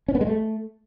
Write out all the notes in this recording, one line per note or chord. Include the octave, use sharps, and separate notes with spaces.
C#4
B3
G#3
A3